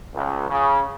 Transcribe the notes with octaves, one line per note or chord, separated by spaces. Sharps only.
C#2
C#3